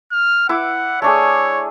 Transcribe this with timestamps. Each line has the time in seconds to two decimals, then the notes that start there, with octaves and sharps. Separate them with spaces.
0.12 F6
0.49 E4 F#5 D6
1.02 A3 D4 G#4 C#5